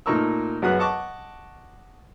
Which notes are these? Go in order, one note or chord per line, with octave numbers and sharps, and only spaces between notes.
A#2 A3 D#4 A#4 C#6 E6
F#2 B3 F#4 G#4 D#6 F#6
D#5 F#5 A5 C#6 D6